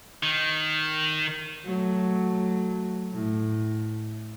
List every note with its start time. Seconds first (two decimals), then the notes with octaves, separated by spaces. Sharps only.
0.23 D#3
1.66 F#3 A3
3.14 A2